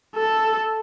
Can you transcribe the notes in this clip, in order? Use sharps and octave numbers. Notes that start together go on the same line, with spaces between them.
A4